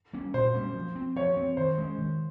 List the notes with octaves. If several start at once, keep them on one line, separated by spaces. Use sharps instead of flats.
G3 A#3 C#4
A#2 C5
G3 A#3 C#4
F3
C4
F3 C#5
C4
D#3 C5
G#3 C#4
D#3